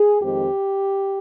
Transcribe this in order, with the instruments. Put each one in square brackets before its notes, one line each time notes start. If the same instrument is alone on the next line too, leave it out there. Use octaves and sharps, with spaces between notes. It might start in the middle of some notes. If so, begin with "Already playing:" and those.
Already playing: [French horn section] G#4
F2 D#3 G#3 C4 G4